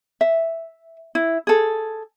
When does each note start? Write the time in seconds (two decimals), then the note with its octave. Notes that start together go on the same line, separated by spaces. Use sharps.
0.21 E5
1.15 E4
1.47 G#4 A4